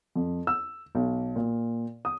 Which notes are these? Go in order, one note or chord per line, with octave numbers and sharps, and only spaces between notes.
F2
E6
B1
A#2
D#6